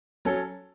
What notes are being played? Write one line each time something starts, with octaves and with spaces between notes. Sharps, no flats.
F#3 C#4 A4